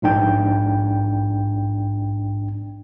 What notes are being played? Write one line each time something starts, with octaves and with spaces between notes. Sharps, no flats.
A#1 G#2 D4 G5